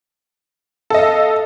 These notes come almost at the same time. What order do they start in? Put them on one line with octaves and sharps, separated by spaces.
A4 D#5 F5